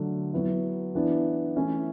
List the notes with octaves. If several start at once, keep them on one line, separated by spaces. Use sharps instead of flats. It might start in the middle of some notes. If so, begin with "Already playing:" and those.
Already playing: D3 F#3 A3
F#3 B3 E4
E3 B3 D4
E3 A3 C#4 E4